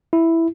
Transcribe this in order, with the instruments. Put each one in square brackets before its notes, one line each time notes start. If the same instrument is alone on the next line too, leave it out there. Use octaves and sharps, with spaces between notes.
[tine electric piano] E4